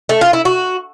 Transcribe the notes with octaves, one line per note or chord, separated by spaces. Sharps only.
A3
F4
E4
F#4